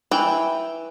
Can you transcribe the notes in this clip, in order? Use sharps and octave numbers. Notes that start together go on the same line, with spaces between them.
E3 G5